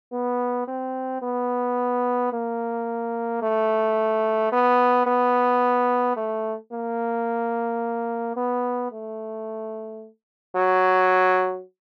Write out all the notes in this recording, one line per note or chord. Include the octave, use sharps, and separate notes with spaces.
B3
C4
B3
A#3
A3
B3
B3
A3
A#3
B3
A3
F#3